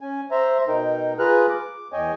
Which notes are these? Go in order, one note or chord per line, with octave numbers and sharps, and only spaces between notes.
C#4 G#5
C5 E5 A#5
B2 D#4 A#4 G5
F4 G#4 B4 A#5 F6 F#6
D6
E2 C#5 D#5 G5 G#5